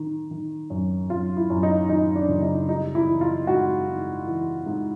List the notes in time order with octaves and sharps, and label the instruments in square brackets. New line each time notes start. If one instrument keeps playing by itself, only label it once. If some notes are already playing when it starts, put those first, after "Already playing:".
Already playing: [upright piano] D#3
D#3
F#2
F#2 F4
E4
F#2
D#4
D#3 D#4
D4
F#1
D#4
G3 D#4
E4
E3
F4
G#2 F#4
G#2
E3
G#2